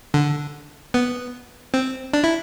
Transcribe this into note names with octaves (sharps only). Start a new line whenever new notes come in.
D3
B3
C4
D4
E4